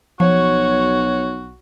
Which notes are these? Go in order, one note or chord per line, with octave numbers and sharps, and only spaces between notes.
B1 F3 F#4 C#5